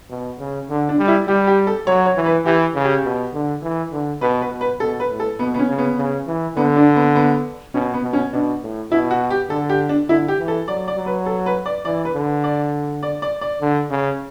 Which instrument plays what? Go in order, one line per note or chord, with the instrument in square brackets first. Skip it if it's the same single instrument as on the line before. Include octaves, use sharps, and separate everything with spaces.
[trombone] B2
C#3
D3
[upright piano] D4
[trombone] G3
[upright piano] E4
[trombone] G3 [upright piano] G4
[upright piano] G4
A4
[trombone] F#3 [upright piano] C#5
[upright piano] C#5
[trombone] E3
[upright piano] B4
[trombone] E3 [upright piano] G4
[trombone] C#3
[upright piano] G4
[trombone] B2
D3
E3
D3
[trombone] B2 [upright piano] B4
[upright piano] B4
[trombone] B2
[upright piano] B4
[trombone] B2 [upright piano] A4
[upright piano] B4
[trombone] A2
[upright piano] A4
[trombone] B2 [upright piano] B3
[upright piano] B3
C#4
[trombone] C#3
[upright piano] B3
[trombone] C#3
E3
[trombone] D3 [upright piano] B3
[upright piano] D4
B3
B3
[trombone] B2 [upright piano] C#4
[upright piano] B3
[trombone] B2
[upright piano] C#4
[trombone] B2 [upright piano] D4
[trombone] A2
[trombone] B2 [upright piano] E4
[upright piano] F#4
G4
[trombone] D3 [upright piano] A4
[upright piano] G4
D4
[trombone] D3 [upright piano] E4
[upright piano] G4
[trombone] E3
[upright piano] A4
[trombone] F#3 [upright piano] D5
[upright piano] D5
[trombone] F#3
[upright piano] B4
A4
B4
D5
[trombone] E3 [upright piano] D5
[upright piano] B4
[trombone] D3
[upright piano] D5
D5
D5
D5
[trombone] D3
C#3